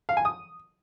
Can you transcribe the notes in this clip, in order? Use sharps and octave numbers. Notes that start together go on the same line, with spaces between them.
F5
G#5
D#6